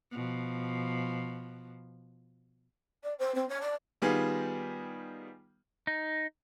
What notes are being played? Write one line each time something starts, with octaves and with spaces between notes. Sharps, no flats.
B2 F3
D5
C5
C4
C#5
D5
D#3 G3 B3 F4 G#4
D#4